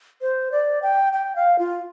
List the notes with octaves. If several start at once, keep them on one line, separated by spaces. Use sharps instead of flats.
C5
D5
G5
G5
F5
F4